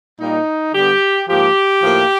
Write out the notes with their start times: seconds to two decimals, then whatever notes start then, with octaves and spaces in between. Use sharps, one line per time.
0.19 A#2 G3 A#3 D#4
0.74 D3 G3 B3 G4
1.28 G#2 F3 A#3 G4
1.82 A2 F3 A#3